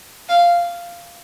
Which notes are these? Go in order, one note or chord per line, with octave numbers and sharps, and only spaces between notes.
F5